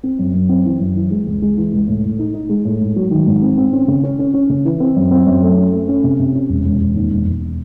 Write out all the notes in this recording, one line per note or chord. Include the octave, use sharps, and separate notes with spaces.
C4
F#2
F#2
C4
E3
F#2
E3
G#3
C#2
G#3
E3
C#2
A2
A2
D#4
D#4
G#3
A2
G#2
F#3
D#3
G#2
C4
C4
C#4
C#3
C#4
C#4
C#4
C#3
E3
C4
F#2
C4
F#2
A3
C#4
A3
C#4
C3
C3
C#4
E1
E1
E1
D#2
E1
E1